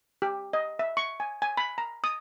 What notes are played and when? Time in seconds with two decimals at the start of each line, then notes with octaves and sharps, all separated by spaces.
0.22 G4
0.53 D#5
0.79 E5
0.97 C#6
1.20 G#5
1.42 G#5
1.57 B5
1.78 A#5
2.04 D#6